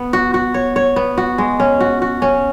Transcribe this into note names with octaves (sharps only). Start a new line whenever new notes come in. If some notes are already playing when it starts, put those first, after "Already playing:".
Already playing: B3
F#4
F#4
C#5
C#5
B3
F#4
G#3
C#4
F#4
F#4
C#4